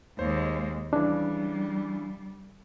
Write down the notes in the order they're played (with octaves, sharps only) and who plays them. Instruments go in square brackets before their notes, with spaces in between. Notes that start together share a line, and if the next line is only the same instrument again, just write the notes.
[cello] D#2 G#3 [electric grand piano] C5 C#5
[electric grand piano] C#3 E3 [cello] G3 [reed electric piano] D4